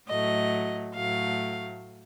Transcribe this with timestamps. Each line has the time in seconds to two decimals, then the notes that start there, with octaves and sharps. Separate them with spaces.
0.09 A2 F#3 A3 D#5
0.95 A2 F#3 A3 F5